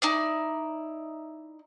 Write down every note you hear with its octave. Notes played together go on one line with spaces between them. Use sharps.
D#4 E4 D5